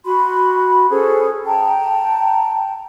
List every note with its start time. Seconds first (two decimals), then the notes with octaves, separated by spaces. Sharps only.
0.04 F#4 B5 C6
0.90 C#4 G#4 A4 C5
1.46 G5 A5 A#5